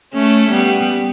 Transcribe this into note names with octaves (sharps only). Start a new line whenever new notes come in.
A3 C#4
G3 B3